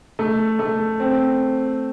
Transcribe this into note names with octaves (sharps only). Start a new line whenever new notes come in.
A3
A3
C4